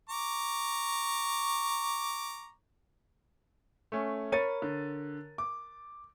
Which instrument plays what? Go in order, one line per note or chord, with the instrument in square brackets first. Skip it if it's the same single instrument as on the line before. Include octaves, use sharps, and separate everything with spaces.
[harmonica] A#5 C#6 D6
[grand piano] A3 C#4
[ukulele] A#4 C#5 [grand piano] B5 A6 D#7
[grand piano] D3
D6